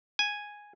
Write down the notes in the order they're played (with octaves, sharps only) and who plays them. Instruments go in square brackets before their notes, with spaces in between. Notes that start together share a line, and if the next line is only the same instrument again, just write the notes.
[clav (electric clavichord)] G#5